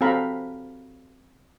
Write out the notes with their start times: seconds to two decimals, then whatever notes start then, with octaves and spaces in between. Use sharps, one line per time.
0.01 C4 F#4 A4 F5 A#5 B5